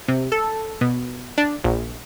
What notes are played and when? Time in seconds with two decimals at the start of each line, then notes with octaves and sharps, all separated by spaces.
0.08 C3
0.32 A4
0.81 B2
1.38 D4
1.64 A#1